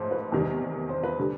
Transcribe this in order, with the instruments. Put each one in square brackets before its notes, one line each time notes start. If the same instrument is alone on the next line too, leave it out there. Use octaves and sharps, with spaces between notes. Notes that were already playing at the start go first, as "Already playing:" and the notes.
Already playing: [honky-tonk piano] A1 G#2 F3 [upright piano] C5 C#5
[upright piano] B4
[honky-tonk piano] E2 C3 D#3 G3
[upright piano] C5
B4
[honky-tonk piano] D3 G3